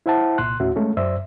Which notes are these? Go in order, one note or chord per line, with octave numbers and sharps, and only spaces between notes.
E4 C5 E5 F#5 A5
C2 A#2 C6 F#6
D#2 A2 C#4 F#4 E5
G#3 A3 C#4
F#2 C5 D5 E5 E6